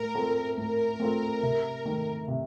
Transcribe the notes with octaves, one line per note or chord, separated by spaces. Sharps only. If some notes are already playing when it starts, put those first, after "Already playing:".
Already playing: A2 A#4
A3 C4 F4 A4
A2 A#4
A3 C4 F4 A4
C3
D#3 A3
C3